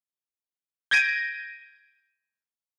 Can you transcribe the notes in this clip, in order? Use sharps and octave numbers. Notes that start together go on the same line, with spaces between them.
G6 G#6 A#6 D7 D#7